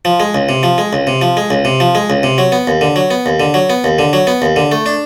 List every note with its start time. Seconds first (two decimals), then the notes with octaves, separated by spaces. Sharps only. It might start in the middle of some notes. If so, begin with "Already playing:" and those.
0.05 F3
0.20 G#3
0.35 C#2
0.49 C3
0.63 F3
0.78 G#3
0.93 C#2
1.07 C3
1.22 F3
1.37 G#3
1.50 C#2
1.65 C3
1.80 F3
1.95 G#3
2.10 C#2
2.23 C3
2.38 F#3
2.52 B3
2.67 D#2
2.81 D3
2.96 F#3
3.11 B3
3.26 D#2
3.40 D3
3.54 F#3
3.70 B3
3.84 D#2
3.99 D3
4.13 F#3
4.27 B3
4.42 D#2
4.56 D3
4.72 A3
4.86 D4